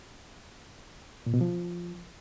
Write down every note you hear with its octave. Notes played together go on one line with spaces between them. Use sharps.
A#2
B2
F3